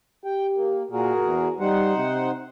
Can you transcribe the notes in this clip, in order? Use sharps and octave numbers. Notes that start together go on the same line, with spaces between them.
G4 G5
A#3
A#2 F#4 G#4 A#4
E2
G3 D#4 C5 F#5
C3